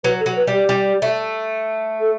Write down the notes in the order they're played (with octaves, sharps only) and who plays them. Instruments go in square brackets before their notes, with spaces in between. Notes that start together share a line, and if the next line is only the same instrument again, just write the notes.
[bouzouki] F#3 [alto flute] B4
[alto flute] A4
[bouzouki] F#3
[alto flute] B4
[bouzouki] G3
[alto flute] G4
[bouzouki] G3
A3
[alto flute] A4